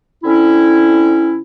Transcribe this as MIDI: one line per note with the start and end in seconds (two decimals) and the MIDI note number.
0.24 1.40 50
0.24 1.40 60
0.24 1.40 61
0.24 1.40 64